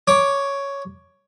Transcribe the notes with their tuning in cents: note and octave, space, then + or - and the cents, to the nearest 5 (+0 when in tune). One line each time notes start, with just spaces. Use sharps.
C#5 +5 D6 +0